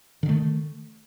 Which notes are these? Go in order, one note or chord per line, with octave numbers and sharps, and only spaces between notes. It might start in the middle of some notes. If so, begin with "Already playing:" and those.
D3 D#3 A3